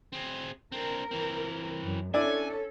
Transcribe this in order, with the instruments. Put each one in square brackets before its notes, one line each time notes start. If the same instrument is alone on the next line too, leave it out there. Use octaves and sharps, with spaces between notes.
[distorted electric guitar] C4 G#4
[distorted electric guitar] C4 D4 [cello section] A#4
[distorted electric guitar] E3 C4
[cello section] F#2
[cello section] C#4 A4 [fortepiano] D4 E4 D5 [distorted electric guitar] G#5